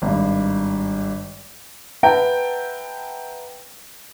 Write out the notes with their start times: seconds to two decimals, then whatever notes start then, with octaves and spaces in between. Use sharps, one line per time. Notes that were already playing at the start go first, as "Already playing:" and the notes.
0.02 G#1 G2
2.03 B4 E5 F#5 G5 A5 A#5